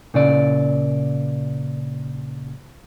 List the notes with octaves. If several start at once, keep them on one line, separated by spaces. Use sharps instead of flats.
A#2 C#3 D5